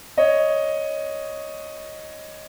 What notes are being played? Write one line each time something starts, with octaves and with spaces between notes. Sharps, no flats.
C#5 D#5